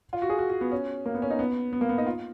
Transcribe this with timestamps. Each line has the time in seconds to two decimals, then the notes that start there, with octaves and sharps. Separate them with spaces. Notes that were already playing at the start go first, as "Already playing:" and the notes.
0.13 F4
0.22 F#4
0.30 G#4
0.39 F#4
0.50 F#4
0.61 B3
0.71 C#4
1.06 A#3
1.15 B3
1.22 C#4
1.30 D#4
1.39 B3
1.73 B3
1.81 A#3
1.89 B3
1.98 D#4
2.07 F4